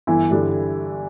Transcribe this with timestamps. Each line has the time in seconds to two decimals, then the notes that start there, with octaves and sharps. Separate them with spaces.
0.07 G1 E3 E4
0.31 G2 D3 G3 D4